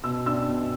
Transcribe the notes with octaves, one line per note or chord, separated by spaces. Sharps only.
B2 E6
D4 E6
B2